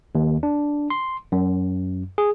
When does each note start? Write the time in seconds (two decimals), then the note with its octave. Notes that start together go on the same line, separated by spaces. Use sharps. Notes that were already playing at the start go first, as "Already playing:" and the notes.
0.15 D#2
0.43 D4
0.90 C6
1.32 F#2
2.18 G#4